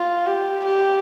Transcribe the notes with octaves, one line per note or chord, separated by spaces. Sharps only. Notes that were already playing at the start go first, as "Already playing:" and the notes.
Already playing: F4
G4
G4